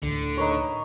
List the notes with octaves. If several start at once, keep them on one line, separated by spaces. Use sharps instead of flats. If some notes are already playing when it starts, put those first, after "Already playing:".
D2 A2 D3
D#4 B4 C#5